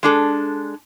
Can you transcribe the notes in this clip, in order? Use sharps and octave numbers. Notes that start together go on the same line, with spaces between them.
G#3 D4 A4